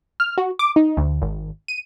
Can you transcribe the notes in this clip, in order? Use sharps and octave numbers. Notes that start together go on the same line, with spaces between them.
F6
F#4
D6
D#4
D2
G#1
D#7